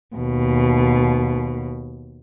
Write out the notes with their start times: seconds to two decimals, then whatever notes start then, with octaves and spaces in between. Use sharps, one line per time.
0.16 D#2 B2